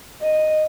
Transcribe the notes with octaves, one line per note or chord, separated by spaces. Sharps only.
D#5